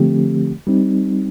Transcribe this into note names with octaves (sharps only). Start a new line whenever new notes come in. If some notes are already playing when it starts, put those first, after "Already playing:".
Already playing: D3 F3 A3 C4 G4
G3 C4 D#4